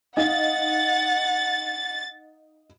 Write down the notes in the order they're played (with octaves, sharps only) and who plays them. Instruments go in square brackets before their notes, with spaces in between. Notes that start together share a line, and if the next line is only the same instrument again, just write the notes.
[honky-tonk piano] D#4 F5 [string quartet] F#5 [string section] A6